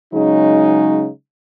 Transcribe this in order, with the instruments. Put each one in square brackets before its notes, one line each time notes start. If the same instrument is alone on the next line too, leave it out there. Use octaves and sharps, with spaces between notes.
[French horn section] C#3 F#3 G#3 D#4